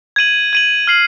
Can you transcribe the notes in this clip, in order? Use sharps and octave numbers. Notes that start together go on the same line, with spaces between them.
G#6 D#7 F#7
G#6 D#7 F#7
F6 C7 F#7